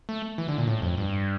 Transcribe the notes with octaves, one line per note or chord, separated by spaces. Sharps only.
A3
E3
D3
A#2
A2
F2
G2